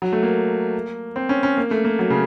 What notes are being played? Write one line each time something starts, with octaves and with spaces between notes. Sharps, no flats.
F#3
A3
A#3
C4
C#4
C#4
A#3
A3
A#3
F#3
C#3